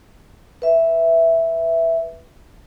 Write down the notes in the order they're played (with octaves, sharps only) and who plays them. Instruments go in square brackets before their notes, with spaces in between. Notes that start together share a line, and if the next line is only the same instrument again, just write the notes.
[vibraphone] B4 E5